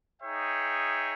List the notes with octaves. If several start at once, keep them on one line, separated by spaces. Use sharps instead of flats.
D#4 G#4 C#5 E5 G5